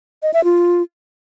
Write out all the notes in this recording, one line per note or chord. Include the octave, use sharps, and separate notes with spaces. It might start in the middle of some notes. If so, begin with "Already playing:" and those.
D#5
E5
F4